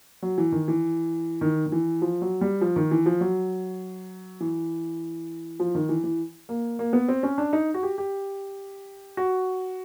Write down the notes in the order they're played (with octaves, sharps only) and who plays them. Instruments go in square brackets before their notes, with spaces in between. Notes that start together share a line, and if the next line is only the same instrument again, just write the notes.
[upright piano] F#3
E3
D#3
E3
D#3
D#3
E3
F3
F#3
G3
F3
D#3
E3
F3
F#3
E3
F3
D#3
E3
E3
A#3
A#3
B3
C4
C#4
D4
D#4
F#4
G4
G4
F#4